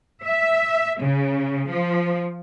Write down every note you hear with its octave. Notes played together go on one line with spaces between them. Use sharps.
E5
C#3
F3